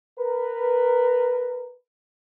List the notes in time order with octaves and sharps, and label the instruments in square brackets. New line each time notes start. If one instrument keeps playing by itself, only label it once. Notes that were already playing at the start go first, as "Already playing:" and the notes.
[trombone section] A#4 B4